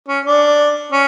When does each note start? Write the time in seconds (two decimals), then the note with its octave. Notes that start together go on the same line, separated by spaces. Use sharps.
0.08 C#4
0.25 D4
0.92 C#4